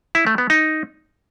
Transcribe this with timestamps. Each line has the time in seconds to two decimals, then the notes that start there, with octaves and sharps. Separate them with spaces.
0.15 E4
0.27 A3
0.38 B3
0.50 D#4